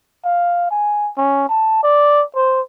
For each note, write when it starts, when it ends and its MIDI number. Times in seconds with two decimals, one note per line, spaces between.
0.25 0.67 77
0.71 1.11 80
1.17 1.48 61
1.49 1.78 81
1.83 2.23 74
2.36 2.61 72